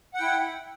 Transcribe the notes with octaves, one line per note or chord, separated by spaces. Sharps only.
E4 F#5 G5